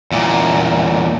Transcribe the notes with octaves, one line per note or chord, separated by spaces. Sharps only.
E2 A#2